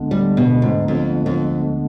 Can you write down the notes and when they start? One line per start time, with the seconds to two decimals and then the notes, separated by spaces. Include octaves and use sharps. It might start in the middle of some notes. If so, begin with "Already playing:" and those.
Already playing: D2 D3 G#3 B3 D4
0.11 G3
0.37 B2
0.62 G#2
0.88 F2
1.26 F2